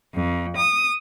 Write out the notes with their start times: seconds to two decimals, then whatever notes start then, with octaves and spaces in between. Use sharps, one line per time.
0.15 F2
0.57 D#6